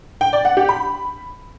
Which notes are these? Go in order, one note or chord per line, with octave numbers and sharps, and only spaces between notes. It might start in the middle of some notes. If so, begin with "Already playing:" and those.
G5
D5
F#5
G4
B5